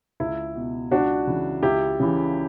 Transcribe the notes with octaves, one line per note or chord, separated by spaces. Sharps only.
C#2 E4
B2
C#2 D4 F#4
C#3 E3
C#2 E4 G4
C#3 E3